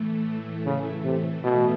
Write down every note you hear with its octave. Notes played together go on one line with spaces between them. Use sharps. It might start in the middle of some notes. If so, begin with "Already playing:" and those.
Already playing: A2 E3 A3
C#3
C3
B2